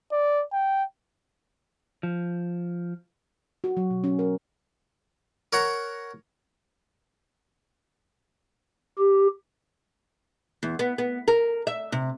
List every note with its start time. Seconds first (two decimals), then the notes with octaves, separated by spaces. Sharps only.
0.12 D5
0.53 G5
2.03 F3
3.64 F#4
3.77 F#3
3.91 B2
4.04 C#4
4.19 A#4
5.53 A#4 C#5 F#5 A#5
8.99 G4
10.63 E2
10.79 B3
10.98 B3
11.28 A#4
11.67 E5
11.92 C3